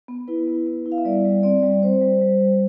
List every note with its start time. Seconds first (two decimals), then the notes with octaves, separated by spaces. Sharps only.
0.08 B3
0.28 E4 B4
0.48 B3
0.67 B3
0.86 E4
0.92 F5
0.98 E5
1.05 G3 D5
1.24 G3
1.43 C4 D5
1.63 G3
1.83 C4 C5
2.01 G3
2.21 G3
2.41 G3